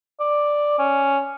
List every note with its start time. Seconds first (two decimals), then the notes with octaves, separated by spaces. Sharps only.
0.20 D5
0.79 C#4